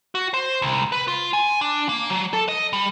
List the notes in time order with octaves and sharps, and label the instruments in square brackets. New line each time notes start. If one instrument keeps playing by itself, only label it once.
[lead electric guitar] F#4
C5
C2
B4
F4
G#5
D4
A#3
F#3
A4
D#5
G3